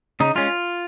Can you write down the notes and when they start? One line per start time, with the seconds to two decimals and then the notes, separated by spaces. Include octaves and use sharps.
0.20 C#3 D#4
0.35 G#3 C#4 F4